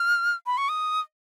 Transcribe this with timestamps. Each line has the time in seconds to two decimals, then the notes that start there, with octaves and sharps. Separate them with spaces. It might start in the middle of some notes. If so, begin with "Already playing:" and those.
Already playing: F6
0.46 B5
0.58 C#6
0.69 D#6